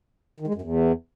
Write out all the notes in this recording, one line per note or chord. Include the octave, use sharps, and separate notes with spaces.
D#3
G#3
F#2
E2